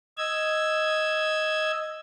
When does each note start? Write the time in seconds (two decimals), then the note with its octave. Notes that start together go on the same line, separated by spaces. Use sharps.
0.18 D#5 E6 G#6